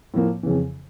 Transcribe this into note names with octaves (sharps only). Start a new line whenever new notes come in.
A2 F3 A#3
F2 C#3 E3